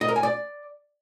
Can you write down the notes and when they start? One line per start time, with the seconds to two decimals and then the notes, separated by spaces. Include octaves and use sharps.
0.01 D#5
0.08 A#4
0.16 G#5
0.23 D5